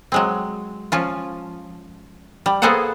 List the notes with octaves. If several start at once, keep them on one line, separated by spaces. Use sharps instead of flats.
F#3 G#3 C4
F3 C#4 F4
G3
A#3 B3 G#4 A4 C5 F#5